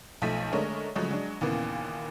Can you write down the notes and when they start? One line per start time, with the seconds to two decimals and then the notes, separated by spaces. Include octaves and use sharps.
0.22 B1 F3 A3 B6 D#7
0.53 D3 G#3 A3 D4 A#4 C#5
0.95 C#3 F3 F#3 G#3 A3 C#4
1.11 F#3 G#3 D4
1.41 D#2 A#2 C#3 E3 A#3 B3